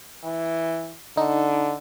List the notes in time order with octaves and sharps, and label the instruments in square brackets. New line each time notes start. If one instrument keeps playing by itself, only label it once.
[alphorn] E3
[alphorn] D3 [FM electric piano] D#4